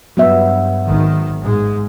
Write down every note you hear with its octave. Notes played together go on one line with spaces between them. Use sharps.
G2 F#3 B3 E5
G#1 D#3
G#2 G#3